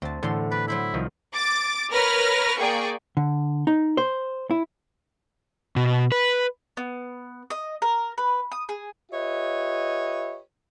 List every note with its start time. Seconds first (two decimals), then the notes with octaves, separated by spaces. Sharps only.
0.02 D2 C4 A5
0.23 E2 A2 D3 A4 C6
0.52 B4 D5
0.68 F#3 E4 C5 B5
0.94 C2 D#3 F3
1.33 D6 A6
1.92 A#4 B4 C#5 F6 A#6
2.60 A#3 G#4 D5 G5 C#6
3.17 D3
3.67 D#4
3.97 C5
4.51 E4
5.76 B2
6.12 B4
6.77 B3
7.50 D#5
7.82 A#4
8.18 B4
8.52 D#6
8.69 G#4
9.12 F4 G4 B4 C#5 D#5 E5